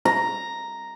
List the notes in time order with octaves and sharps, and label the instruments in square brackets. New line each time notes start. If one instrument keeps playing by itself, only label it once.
[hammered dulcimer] A#5